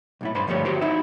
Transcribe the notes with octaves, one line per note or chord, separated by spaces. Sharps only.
B1 A2 E4
G2 C5 B5 C6
D2 G2 F3 G3 A3 C#5
F#4 G4 C5
D#4 E4 F#4 E5